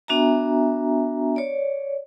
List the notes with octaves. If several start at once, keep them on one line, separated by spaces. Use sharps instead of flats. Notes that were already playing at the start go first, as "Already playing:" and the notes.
B3 D4 F#4 E5 G#5 A#5
C#5 D5